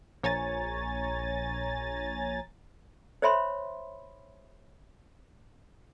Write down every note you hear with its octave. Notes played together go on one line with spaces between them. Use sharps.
A#1 C#5 G#5 A#5 A6
C5 C#5 E5 B5 C6